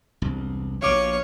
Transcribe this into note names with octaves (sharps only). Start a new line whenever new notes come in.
E1 C2
A#1 B2 C#5 F5 D6